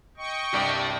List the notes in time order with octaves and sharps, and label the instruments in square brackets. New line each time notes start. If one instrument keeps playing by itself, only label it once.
[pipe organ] D#5 G5 C#6
[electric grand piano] C2 G2 [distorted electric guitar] G4 D5